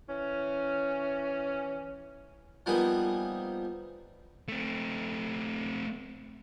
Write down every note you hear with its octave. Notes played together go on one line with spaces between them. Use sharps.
E3 C#4
F3 G3 A#3 B3 D#4 G#4
A3 C4